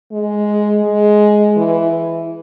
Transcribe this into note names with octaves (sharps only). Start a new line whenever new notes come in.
G#3
G#3
E3